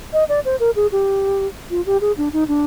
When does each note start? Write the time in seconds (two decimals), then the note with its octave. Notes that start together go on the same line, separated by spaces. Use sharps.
0.13 D#5
0.29 D5
0.45 C5
0.60 A#4
0.76 G#4
0.92 G4
1.70 F4
1.86 G4
2.01 G#4
2.18 D4
2.33 D#4
2.48 D4